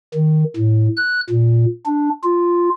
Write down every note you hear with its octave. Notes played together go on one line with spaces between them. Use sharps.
D#3
A2
F#6
A#2
D4
F4